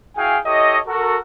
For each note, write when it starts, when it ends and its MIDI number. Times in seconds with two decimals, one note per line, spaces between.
0.17 0.38 64
0.17 0.38 66
0.17 0.38 68
0.17 0.38 77
0.17 0.38 79
0.17 0.38 80
0.46 0.79 64
0.46 0.79 67
0.46 0.79 69
0.46 0.79 73
0.46 0.79 75
0.87 1.18 66
0.87 1.18 69
0.87 1.18 70